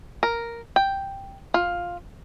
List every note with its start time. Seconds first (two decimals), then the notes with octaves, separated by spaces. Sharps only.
0.23 A#4
0.76 G5
1.54 F4